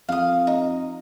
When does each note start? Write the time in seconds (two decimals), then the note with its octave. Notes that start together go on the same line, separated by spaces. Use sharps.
0.09 F2 F5 D#6
0.47 D#4